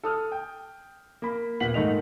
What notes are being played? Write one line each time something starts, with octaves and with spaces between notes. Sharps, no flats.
A4 D#6 F6
G5
A#3 B5
D#1 A#2 B3 F#5 B6 F#7
G#2 D#3 A3 D#4 F7